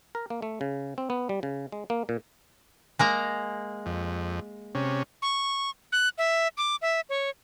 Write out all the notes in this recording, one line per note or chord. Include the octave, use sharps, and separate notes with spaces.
A#4
A#3
A3
C#3
C4
B3
G3
C#3
G#3
A#3
A#2
G#3 A#3 A#5
F2
C3 C#4
C#6
F#6
E5
D6
E5
C#5